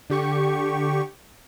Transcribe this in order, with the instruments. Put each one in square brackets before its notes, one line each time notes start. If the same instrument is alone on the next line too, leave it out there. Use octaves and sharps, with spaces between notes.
[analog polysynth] D3 G4 C#6